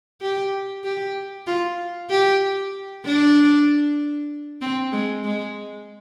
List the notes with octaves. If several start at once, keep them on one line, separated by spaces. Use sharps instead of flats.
G4
G4
F4
G4
D4
C4
G#3
G#3